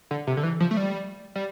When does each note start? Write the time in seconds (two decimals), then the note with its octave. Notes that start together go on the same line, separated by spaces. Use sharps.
0.11 D3
0.27 C3
0.37 D3
0.43 E3
0.60 F3
0.71 A3
0.77 G3
1.36 G3